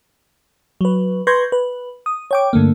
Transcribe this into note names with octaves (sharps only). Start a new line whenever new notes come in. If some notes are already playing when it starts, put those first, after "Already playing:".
F#3 B4
B4 C6 C#6 G6 G#6 A#6
B4
D#6
C#5 G5 D6
G2 D3 A3 A#3